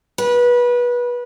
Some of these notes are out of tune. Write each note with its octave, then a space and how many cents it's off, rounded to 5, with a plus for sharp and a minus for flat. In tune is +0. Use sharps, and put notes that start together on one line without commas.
B4 -25